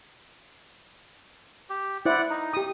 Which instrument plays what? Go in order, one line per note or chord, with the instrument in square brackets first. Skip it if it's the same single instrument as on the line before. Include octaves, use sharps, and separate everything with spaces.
[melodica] G4
[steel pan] E4 C5 [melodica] D5 F#5
[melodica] D#4
[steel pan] G4 D#6